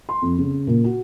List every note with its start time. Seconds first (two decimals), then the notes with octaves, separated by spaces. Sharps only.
0.09 C6
0.22 F2
0.38 C#3
0.67 A#2
0.84 F#4